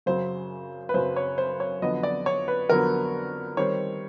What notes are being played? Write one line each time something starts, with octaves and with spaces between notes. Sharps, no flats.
F#2 C#3 F#3 C5
B4
F#2 C#3 F#3 C5
C#5
C5
C#5
F2 D3 F#3 B3 D#5
D5
C#5
B4
F2 D3 F#3 B3 A#4
D#3 G3 C4 C#5